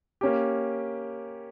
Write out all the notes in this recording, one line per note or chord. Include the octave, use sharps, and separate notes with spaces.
A#3 C#4 G4